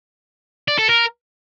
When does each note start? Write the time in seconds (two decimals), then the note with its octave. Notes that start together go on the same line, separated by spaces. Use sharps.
0.68 D5
0.78 A4
0.89 A#4